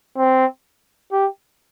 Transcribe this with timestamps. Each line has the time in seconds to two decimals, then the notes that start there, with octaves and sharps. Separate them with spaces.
0.17 C4
1.12 G4